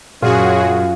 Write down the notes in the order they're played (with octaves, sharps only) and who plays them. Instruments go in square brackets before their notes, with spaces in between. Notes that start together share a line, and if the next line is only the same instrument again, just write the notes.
[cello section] F#2 [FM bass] A#2 [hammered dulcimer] F4 [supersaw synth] F#4 G#4